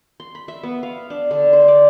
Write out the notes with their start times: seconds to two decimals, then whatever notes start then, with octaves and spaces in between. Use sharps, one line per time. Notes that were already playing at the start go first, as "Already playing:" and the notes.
0.20 C6
0.35 B5
0.48 E5
0.63 B3
0.83 F5
1.10 D4
1.31 D3
1.53 C5
1.68 D5